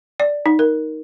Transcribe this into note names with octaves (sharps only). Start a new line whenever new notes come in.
D5
D#4
A#4